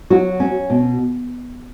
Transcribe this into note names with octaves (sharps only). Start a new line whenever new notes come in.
F#3 F#4
C#4
B2